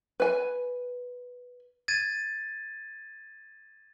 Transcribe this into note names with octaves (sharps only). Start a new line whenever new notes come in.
B4 G#5
G#6 A6 D#7